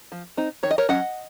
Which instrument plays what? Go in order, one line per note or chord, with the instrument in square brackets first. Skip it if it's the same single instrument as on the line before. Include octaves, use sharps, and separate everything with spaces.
[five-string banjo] F3
C4 D#4
D#3 C#5
D#5
A#4 C#5
F#3 C#4 D#5 F#5